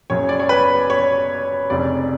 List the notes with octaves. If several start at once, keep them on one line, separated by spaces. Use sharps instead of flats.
F#1 F#2 C#3 C#5
D5
C#5
B4
C#5
F1 F2 C#3 D5